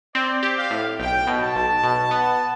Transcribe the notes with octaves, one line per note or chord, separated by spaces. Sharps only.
C4 D5
G4
F5
A2
B1 G5
B2
A5
B1
B2
B3